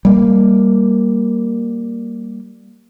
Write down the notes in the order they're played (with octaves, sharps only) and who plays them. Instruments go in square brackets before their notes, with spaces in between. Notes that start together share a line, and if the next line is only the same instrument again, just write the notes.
[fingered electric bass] G3 A#3